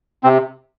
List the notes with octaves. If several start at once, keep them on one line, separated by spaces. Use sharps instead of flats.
C3 C4